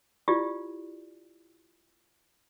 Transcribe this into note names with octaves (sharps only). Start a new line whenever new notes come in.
E4 F4 G4 D5